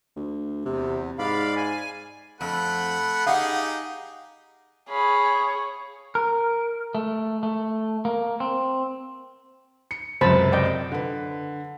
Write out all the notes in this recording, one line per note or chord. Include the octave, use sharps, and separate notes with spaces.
D2
E2 C3
G#2 D5 F5 B5
G#5
F2 A3 F#5 B5
D#4 G4 G#4 F5 F#5
G#4 C#5 F5 B5
A#4
A3
A3
A#3
C4
C#7
C#2 F#2 C3 C5 A5 B5
D5 D#5 G5
D3 B4